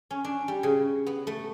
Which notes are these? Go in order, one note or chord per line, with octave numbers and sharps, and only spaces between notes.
C#4
D4
G3
C#3
B3
A3